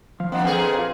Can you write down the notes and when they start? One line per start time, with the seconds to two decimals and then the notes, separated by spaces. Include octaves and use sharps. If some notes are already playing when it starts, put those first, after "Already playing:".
0.20 F3 F5
0.32 A#3 C4 D4 D#5 F#5 C6
0.44 F2 A#2 C4 G#4 A4 B4 F5 G5
0.79 F4 G4